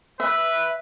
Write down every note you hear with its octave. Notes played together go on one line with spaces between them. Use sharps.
B4 E5